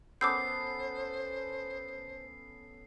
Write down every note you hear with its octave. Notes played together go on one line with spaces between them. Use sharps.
B3 C#4 A4 C5 D6 E6 G6 C7